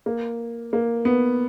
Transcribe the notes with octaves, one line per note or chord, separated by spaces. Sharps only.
A#3
A#3
B3